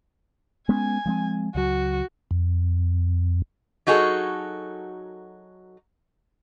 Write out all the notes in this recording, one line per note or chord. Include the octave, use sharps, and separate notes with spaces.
G#3 B3 C#4 G#5
F3 G#3 C4
C#2 F#3 F#4
F2
F#3 D#4 F#4 G#4 A4